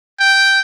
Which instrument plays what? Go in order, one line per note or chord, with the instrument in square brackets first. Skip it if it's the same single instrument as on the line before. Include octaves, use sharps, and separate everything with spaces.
[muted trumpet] G5